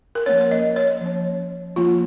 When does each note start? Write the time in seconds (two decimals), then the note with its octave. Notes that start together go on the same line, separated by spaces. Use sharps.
0.15 A#4
0.26 F3 A#3 C#4 C#5
0.41 C#5
0.51 D#5
0.76 C#5
1.01 F3 A#3 C#4
1.76 F3 A#3 C#4 F4